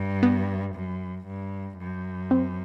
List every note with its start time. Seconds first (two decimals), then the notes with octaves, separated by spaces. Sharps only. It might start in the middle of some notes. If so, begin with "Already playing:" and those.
Already playing: G2
0.23 B3
0.75 F#2
1.27 G2
1.79 F#2
2.31 C4